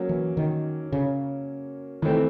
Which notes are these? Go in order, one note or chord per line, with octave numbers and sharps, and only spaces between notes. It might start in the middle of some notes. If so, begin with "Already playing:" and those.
Already playing: F#3 A#3 C#4
E3
D#3
C#3
D#3 E3 A3 C4